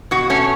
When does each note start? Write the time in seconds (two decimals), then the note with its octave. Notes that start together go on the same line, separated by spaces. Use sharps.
0.11 B2 F#4
0.30 A3 C#4